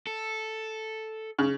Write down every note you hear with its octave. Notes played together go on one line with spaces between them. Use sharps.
A4
C#3